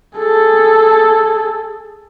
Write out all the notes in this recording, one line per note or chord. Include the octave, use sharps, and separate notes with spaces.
G#4 A4